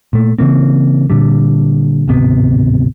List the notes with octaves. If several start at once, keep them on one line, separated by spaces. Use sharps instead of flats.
A#2 A3
C#3 E3 A#3 C4
A#2 D3 G3
D1 G#1 C3 B3